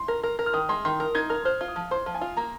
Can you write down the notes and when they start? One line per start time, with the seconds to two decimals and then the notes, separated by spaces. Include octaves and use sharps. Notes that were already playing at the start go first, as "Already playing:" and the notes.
Already playing: C6
0.08 A#4
0.23 A#4
0.39 A#4
0.46 F6
0.54 D#3 D#6
0.69 G#3 C6
0.85 D#3 C6
1.00 A#4
1.15 D#4 G#6
1.30 A#4 F6
1.45 C5 F6
1.61 F4
1.68 D#6
1.76 F3
1.91 C5 C6
2.06 F3
2.14 G#5
2.21 F4
2.37 A#3 A#5